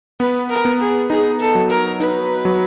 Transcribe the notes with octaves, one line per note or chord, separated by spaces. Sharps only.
B3 B4
A#4
B3
G#4
D#4 G#4
A4
F#3
A#4
D#4 B4
F#3